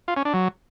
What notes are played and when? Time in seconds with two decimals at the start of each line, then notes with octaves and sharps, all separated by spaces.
0.08 F4
0.17 C#4
0.25 D4
0.34 F#3